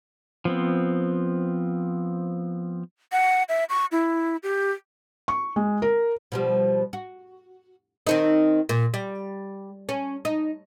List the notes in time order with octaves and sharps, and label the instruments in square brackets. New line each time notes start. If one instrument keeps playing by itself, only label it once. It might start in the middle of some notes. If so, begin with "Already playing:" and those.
[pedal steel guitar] F3 B3 C4
[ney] F#5
E5
C#6
E4
G4
[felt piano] C#6
G#3
A#4
[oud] B2 F3 G3
F#4
D#3 C4 D#4
A#2
G3
C#4
D#4